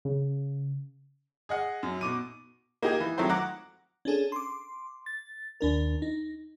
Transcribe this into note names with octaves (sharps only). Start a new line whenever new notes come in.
C#3
G#4 D#5 F#5
F#2
B2 D6 D#7
A#3 D#4 G4 G#4 D#5
E3
D#3 F3 F#3 A3 C4 C5
F#5 A#5 D6
C#4 D4 G#4 A4
C6 D6
A6
D#2 D4 A#4
D#4